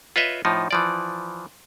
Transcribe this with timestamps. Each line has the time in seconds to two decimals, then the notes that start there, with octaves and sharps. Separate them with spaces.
0.16 F4 B4 C#5 D#5 E5
0.45 A2 F3 D#4
0.71 E3 F3 D5